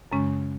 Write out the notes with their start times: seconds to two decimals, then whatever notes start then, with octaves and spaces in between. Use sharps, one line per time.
0.12 F#2 C#3 G#3 C#4